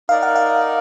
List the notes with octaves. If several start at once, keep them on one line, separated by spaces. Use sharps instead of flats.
D#4 A#4 D5 F5
F#5
F5